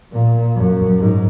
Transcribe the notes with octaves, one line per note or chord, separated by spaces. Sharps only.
A#2
F#2
G#2